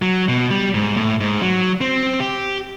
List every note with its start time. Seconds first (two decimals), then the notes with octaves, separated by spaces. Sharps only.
0.02 F#3
0.29 B2
0.50 G3
0.74 G#2
0.97 A2
1.21 G#2
1.42 F#3
1.81 C4
2.20 G4